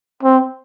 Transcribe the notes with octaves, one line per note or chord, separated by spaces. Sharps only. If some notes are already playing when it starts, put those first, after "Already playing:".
C4